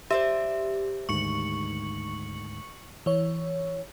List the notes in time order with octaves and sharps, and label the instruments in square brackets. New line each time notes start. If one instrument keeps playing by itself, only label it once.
[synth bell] G4 [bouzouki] C5 D5 E5
[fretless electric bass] D2 G#2 D#3 [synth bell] C#6 C#7 F#7
[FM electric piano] E3 C#5